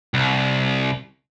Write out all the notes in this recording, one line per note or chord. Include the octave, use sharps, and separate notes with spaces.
C2